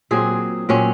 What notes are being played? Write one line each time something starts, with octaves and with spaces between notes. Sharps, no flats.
A#2 F#3 C4 G#4
A#2 F#3 C4 C#4